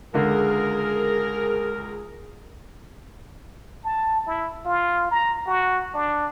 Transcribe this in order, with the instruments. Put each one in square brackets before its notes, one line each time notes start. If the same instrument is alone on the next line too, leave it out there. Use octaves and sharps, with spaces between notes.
[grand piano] C#2 D3 [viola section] G#4 [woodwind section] A#4
[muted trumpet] A5
E4
F4
A#5
F#4
D4